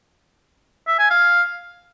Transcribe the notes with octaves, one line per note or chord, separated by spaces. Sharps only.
E5
G#5
F5